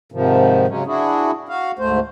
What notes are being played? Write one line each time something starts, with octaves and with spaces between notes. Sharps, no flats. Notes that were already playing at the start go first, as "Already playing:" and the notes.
G#2 C3 D#3 F3
C#3 F#3 G#3 C#4
D4 E4 F#4 G#4
F#4 F5
D2 G#2 A3 C5